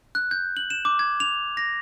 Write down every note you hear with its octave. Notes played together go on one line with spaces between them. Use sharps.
F#6
G6
F#7
E7
D6
G#6
F7
A#6